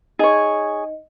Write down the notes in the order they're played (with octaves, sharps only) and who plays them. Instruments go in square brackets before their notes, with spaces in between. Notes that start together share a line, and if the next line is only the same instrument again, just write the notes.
[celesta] D#4 D#5 [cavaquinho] G#4 C#5